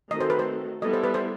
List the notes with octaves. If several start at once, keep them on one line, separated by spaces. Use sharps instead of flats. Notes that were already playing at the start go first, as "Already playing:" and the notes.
D#3 A3 C4 F#4 A4 D#5
C5
B4
C5
G3 B3 E4 A4 D#5
C5
B4
C5